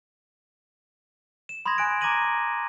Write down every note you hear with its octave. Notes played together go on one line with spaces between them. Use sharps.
E7
B5 C6 D#6 G#6 A#6
G#5 F#6 D7
A#5 D6 G#6 A#6 D#7 F#7